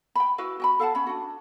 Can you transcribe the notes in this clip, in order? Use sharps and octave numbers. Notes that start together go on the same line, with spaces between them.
G5 B5
E4 F#4 B4 F5
F#4 G5 B5
A4 F5 F#5 A5
C#4 B5
D4 F#4